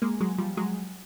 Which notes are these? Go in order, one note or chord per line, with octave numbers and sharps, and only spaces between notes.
G#3 A#3
F#3 G#3
F3 G3
F#3 G#3